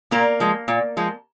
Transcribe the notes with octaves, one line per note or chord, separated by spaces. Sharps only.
A#2 A#3 A#4
F3 G#3
A#2
F3 G#3